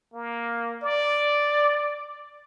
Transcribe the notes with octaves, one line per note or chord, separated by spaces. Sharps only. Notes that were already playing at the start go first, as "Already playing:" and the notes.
A#3
D5